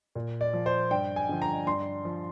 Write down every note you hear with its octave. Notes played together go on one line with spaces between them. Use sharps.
A#2
D5
F3
C5
G2 G5
G#5
D3 F3
A#5
G2 C6
F3